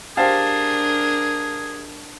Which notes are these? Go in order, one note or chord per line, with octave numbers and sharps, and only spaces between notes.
D4 G4 G#4 A#4 C5 F5 A5